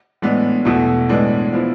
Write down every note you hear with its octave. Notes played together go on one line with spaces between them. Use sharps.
A2 E3 G#3 B3 D4
E2 B2 A3 E4
A2 E3 G#3 B3 D4
F3 B3 E4